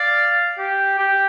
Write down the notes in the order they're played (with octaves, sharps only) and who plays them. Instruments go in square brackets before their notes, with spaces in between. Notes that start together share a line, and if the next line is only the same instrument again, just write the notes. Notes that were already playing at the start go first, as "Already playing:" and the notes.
Already playing: [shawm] D5 [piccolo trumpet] F5
[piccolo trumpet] G4
G4